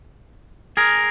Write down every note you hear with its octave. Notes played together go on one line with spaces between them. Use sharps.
G#4 A#4